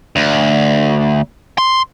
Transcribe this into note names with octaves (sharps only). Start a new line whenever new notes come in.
D2
C6